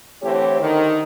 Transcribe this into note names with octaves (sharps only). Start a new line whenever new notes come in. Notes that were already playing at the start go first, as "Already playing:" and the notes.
D3 E3 A3 C4 G4 C#5
D3 D#3